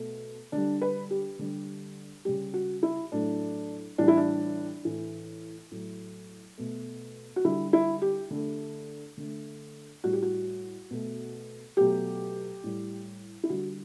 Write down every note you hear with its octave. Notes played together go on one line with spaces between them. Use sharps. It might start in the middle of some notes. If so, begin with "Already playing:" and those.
Already playing: B2 A3
D3 G3 D4
B4
G4
D3 G3
C#3 G3 G4
F#4
E4
A2 F#3 A3 D4
A2 E3 G3 D4
E4
D4
A2 E3 A3
A2 F#3 A3
B2 A3
F#4
D3 G3 E4
E4
G4
D3 A3
D3 A3
A2 G3 F#4
G4
F#4
B2 A3
B2 F#3 A3 G4
A2 G3
E4
D3 G3 F#4